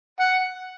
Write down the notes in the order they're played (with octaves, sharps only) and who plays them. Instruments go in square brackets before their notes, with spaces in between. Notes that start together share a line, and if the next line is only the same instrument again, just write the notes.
[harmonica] F#5